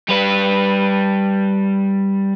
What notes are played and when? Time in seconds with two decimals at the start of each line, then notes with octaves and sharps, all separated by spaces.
0.08 G3 B4